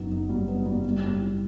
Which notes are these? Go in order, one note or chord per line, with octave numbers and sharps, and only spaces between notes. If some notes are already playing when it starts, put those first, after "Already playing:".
Already playing: F#1 F#2 F#3 B3 D#4
D#4
G3
B3
G3
G3
G3
E4